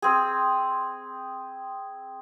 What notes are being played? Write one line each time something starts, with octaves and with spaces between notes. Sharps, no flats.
C4 G#4